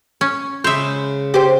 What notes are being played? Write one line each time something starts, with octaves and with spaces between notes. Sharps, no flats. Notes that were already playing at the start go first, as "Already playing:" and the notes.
C#4
C#3 G#3 C5 E5 B5
G4 C5